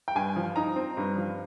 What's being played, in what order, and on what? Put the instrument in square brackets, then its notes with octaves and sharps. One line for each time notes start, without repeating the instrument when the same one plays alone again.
[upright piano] G5
G2 G#5
F3
D#4 A#5
C4
G2
F3